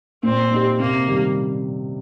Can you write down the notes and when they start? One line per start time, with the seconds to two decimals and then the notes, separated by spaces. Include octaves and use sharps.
0.23 A#2 C4
0.51 A#3 D#4 G4
0.79 C3 A#3
1.07 D#3 G3